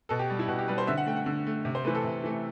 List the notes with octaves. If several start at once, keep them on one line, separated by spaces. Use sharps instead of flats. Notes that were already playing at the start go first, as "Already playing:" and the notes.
B2 A4
G4
G3
E4
B2 F#4
G4
G3 B4
C5
D3 E5
F#5
A3 G5
F#5
D3
A3
C3
C5
E3 A3 B4
A4
C3
E3 A3